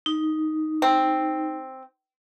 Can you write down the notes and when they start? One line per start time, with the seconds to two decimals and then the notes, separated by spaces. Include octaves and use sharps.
0.06 D#4
0.82 C4